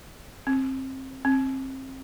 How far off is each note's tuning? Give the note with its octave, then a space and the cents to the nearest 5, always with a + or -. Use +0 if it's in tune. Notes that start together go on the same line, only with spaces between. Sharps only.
C4 +25
C4 +30